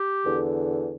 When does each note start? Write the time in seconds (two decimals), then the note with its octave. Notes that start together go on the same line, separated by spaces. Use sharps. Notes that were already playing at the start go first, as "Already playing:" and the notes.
Already playing: G4
0.25 E2 D3